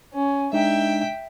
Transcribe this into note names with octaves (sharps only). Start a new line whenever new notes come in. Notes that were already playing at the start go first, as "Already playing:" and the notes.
C#4
G#3 D4 D#4 E5 G5